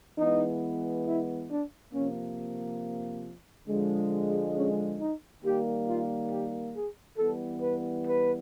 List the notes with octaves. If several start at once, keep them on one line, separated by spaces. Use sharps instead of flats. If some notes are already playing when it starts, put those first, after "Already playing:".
E3 G#3 B3 D#4
E4
D4
C3 F3 A#3 C#4
D3 F3 G#3
C#4
D#4
D#3 G3 A#3 G4
F4
G4
G#4
E3 G3 B3 A4
B4
B4